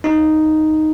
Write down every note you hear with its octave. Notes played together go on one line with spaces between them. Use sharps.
D#4